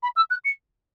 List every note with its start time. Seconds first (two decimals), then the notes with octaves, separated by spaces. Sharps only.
0.03 B5
0.16 E6
0.30 F#6
0.44 C#7